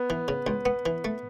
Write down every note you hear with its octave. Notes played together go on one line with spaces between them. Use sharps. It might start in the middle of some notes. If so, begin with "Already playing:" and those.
Already playing: B3
E3
C#3
C#2
B3
E3
A3